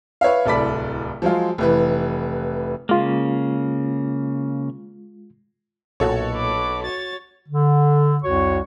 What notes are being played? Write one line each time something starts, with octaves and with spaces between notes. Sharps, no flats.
B4 C#5 E5 F5
D1 C2 A4 D5 B5 B6
F3 F#3 G#3 F4
F1 E3 B4
C#3 G#3 A#3 F4
B1 A#2 F#4 A4 C#5
B5 D6
F#4 C#5 A6
D3
C2 F2 F#4 C#5 C#6